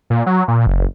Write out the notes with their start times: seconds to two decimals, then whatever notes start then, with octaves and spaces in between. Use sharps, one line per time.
0.10 A#2
0.26 F#3
0.48 A#2
0.67 F#1